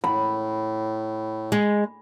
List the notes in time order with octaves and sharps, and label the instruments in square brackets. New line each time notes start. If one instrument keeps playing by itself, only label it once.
[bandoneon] A2 [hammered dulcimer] B5
[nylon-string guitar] G#3